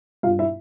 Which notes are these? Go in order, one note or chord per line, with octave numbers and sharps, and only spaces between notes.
G2 F4 F5
E4 E5